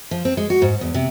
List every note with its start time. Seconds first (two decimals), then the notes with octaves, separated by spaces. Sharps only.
0.11 F3
0.25 C4
0.37 G#3
0.50 F#4
0.62 G#2
0.81 E2
0.94 C3